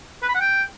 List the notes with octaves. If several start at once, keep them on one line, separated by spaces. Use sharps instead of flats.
B4
B5
F#5
G5